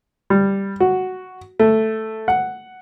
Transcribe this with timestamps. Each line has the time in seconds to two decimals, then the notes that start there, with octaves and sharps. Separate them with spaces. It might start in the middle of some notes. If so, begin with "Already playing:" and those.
0.30 G3
0.80 F#4
1.59 A3
2.28 F#5